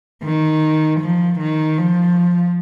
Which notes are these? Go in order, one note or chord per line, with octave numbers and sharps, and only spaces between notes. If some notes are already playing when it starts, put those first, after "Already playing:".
D#3
F3
D#3
F3